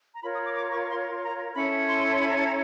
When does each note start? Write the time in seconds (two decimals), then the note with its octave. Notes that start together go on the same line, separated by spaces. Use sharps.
0.13 A#5
0.22 F4 A#4 C#5 B5
0.34 D#6
0.45 D6
0.56 D6
0.72 C#6
0.89 C6
1.21 A#5
1.54 C#4 E4 A4 C#5 B5
1.88 C6
1.99 C6
2.10 C6
2.21 B5
2.29 A#5
2.37 A5
2.45 A#5